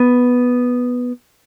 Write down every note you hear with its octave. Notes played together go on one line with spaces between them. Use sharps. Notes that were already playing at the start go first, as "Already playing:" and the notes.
Already playing: B3